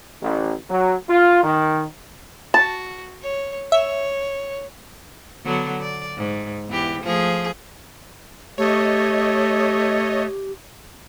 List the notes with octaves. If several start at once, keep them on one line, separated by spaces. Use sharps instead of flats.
A1
F#3
F4
D#3
F#4 A5
C#5
C#5 E5
D3 F#3 B3
D5
G#2
E2 E3 G4
F3 A3 G#4
A3 G4 C#5 D#5